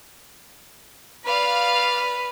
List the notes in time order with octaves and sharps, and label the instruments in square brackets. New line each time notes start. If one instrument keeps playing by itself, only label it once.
[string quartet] B4 [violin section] D5 F5 F6